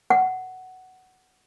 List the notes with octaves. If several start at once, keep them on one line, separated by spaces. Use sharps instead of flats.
F#5